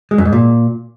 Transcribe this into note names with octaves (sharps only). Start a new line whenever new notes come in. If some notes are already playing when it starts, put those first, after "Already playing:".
G#3
F#2
G#2
A#2